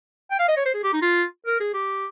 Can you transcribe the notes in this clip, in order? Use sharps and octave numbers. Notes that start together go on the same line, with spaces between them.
G5
F5
D#5
C#5
C5
G#4
G4
D#4
F4
A#4
G#4
G4